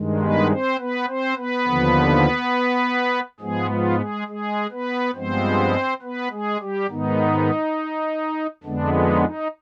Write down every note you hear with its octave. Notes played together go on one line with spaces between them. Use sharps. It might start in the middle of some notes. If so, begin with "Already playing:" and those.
Already playing: G2 D#3 G#3
B3 B4
C4 C5
B3 B4
C4 C5
B3 B4
D#2 D3 F3
G#2 F3 G#3 B3 G#4
F3 F4
G#3 G#4
G#3 G#4
B3 B4
G2 F3 G#3 B3 C4 C5
B3 B4
G#3 G#4
G3 G4
G#2 D#3 B3 D#4
F2 D3 G#3 B3 D4
D#4
D#4